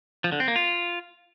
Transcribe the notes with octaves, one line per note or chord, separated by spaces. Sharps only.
F3
D3
C4
A#3
F4